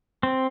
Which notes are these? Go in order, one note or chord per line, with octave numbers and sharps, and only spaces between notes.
C4